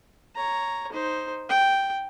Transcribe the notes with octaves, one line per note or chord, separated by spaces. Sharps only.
C#5 A#5
D#4 C5
G5